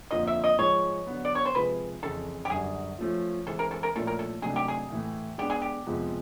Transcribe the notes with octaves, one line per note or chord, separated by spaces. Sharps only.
F2 D3 F3 A#3 D#5
E5
D#5
G#2 F3 G#3 C#5
D3 F#3 B3
D5
C#5
C5
C3 F3 G#3 B4
F2 C#3 E3 A4
G4
F#2 D3 G3 G#4
F3 A3 C#4 F4
E3 G#3 C4 A4
A#4
A4
A#4
A#2 F3 A3 C#4 E4 A4
A#4
A4
C3 D#3 F#3 A3 D4 G#4
G4
G#4
A2 E3 A3
G#3 B3 D4 G4
G#4
G4
F2 C3 F3 G#3 B3